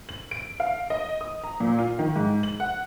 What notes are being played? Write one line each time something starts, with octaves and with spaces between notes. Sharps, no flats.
F#7
D7
F5
D#5
D#6
A#5
A#2
F4
D#3
G#2
F#7
F#5